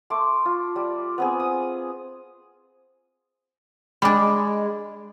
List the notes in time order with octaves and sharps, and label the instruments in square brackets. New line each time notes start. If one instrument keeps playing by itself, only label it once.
[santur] A3 C6 D6
F4
G3
B3 C4 G#4
D#6
[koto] G3 D4 [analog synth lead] G#3 [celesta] B5 D6